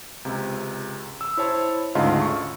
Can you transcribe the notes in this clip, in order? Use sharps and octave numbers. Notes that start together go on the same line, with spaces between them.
C#2 C3
E6
E4 C5 C#5 A5
D2 G#2 C#3 F4 D#5 A5
C#6